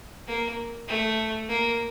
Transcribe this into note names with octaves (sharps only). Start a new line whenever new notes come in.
A#3
A3
A#3